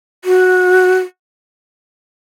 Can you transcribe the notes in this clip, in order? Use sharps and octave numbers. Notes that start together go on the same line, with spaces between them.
F#4